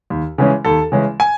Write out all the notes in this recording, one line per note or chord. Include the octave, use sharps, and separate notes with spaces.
D#2
C#3 E3 G#3 C#4
D#2 A4
C#3 E3 G#3 C#4
G#5